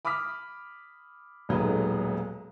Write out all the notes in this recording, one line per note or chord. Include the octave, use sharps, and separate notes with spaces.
B5 D6 D#6 F6 B6
D#1 B1 F#3 G#3 B4